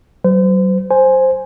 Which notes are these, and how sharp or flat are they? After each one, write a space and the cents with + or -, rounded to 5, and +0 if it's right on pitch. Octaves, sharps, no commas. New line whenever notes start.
F#3 +35 C5 -40
C5 +0 G#5 +0